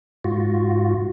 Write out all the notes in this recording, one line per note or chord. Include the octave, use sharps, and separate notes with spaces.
G#2 F4 F#4